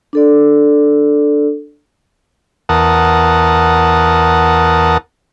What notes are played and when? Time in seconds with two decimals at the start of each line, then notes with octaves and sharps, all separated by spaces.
0.13 D4 A4 D5
2.69 E2 A#4 F#5 A5 D#6